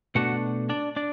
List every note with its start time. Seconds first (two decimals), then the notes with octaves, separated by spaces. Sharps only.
0.15 B2 A3 D4 F#4 F#5
0.69 D4 D5
0.96 D4 D5